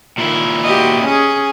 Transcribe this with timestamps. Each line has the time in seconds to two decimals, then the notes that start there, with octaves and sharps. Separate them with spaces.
0.18 A#2 D#3 E4
0.64 F#4 G4 D#5
1.04 C#4 G#4